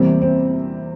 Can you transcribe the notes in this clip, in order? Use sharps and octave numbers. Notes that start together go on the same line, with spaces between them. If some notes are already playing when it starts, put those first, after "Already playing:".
Already playing: E2 C3 G3 A#3 C4
C4